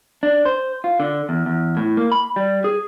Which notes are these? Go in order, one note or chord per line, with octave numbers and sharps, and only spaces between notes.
D4
C5
F4
D3
E2
E2
A2
A#3
B5
G3
G#4